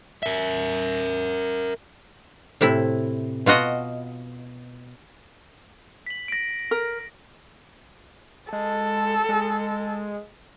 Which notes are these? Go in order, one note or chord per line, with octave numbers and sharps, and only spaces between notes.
A#4 E5
A2 C3 E4
B2 F4 F#4 D#5
B6 F#7
A#6 D7
A#4
G#3 A4
G#3